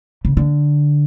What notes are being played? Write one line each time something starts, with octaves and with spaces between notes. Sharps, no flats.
C#3
D3